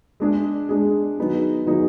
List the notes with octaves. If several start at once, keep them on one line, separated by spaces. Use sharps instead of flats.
G#3 D4 G#4
G#3 D4 G#4
D#3 F#3 B3 D#4 G#4
D#3 F#3 B3 D#4 G#4